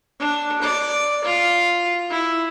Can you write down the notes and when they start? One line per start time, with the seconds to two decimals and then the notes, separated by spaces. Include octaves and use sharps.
0.20 D4
0.62 D5
1.24 F4
2.10 E4